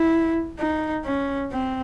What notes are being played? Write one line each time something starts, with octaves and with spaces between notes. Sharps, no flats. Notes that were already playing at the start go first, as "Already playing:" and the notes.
Already playing: E4
D#4
C#4
C4